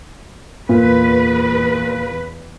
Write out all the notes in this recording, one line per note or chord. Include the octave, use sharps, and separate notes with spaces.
E2 A#2 B4